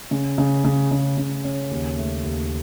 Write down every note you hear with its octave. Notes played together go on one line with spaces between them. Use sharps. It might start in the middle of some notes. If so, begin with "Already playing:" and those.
C#3
C#3
C#3
C#3
C#3
C#4
D#2
A3
D#2